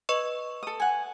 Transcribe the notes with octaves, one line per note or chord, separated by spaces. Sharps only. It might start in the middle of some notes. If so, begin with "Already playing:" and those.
B4 D#5 C#6
A4 D#6
F#5 G#5